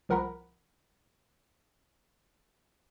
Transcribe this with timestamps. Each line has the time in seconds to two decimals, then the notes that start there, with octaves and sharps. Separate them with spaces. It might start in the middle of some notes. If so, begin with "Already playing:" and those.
0.09 C2 F3 A#4 F#5 A#5 B5